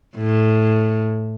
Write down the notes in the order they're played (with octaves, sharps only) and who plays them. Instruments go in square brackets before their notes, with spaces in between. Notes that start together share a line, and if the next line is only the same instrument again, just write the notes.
[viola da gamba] A2